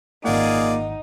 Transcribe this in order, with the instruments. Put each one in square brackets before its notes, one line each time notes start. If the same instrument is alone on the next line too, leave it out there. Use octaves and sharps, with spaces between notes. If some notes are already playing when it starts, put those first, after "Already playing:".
[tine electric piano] G#1 F#5 [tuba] A#3 [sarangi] D#4 [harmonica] F4 G#4 D5